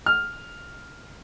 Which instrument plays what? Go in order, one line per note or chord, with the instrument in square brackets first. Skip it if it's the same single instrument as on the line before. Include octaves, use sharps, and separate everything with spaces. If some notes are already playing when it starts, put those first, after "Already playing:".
[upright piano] F6